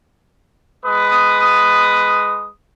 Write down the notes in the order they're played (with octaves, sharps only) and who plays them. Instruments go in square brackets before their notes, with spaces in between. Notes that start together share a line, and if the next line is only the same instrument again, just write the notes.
[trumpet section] G#3 B4 D#6